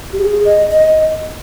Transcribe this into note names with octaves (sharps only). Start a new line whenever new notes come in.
G4
G#4
D#5
D#5